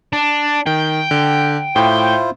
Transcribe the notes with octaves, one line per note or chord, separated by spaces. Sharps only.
D4
D#3 G5
D3
A2 E4 F4 C5 G5